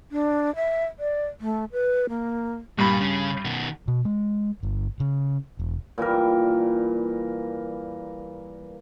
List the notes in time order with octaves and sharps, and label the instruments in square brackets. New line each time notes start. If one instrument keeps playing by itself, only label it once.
[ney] D4
E5
D5
A3
B4
A#3
[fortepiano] G2 B5 [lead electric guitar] A#2
[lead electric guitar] C#3
B2 D#3
[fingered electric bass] B2
G#3
G1
C#3
E1
[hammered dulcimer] A#2 E3 G3 A#4